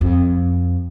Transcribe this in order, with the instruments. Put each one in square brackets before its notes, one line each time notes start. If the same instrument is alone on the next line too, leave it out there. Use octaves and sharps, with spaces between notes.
[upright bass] F2